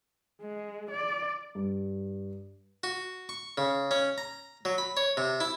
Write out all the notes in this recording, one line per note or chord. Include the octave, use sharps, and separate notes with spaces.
G#3
D5
G2
F#4
C#6
C#3
C#4
A#5
F#3
B5
C#5
C3
E4